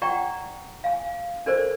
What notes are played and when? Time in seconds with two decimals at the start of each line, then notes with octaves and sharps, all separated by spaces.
0.02 D5 F#5 G5 A#5 C#6
0.84 F5 G#5
1.46 D4 A4 A#4 C5 D5